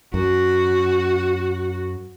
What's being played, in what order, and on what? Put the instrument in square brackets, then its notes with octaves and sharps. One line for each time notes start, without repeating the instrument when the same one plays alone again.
[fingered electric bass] F#2 [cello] F#4